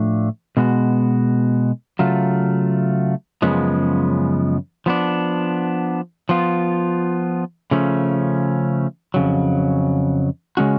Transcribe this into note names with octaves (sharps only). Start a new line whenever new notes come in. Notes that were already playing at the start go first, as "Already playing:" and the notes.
Already playing: A2 F3 A3 D4
B2 G#3 B3 F#4
C#3 F#3 A3 F4
F#2 C#3 F3 G#3 B3
F3 B3 D4
F3 B3 F4
C#3 F3 A3 C#4
F2 C#3 F#3
C#3 G#3 C#4 F#4